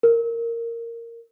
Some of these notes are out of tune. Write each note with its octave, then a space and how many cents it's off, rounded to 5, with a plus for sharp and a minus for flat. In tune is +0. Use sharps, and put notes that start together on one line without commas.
A#4 -10